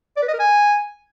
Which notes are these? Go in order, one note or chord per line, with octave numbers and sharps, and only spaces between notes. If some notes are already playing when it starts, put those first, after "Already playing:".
D5
B4
D#5
A#4
G#5